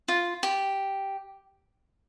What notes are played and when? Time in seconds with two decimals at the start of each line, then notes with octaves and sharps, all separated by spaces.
0.08 F4
0.43 G4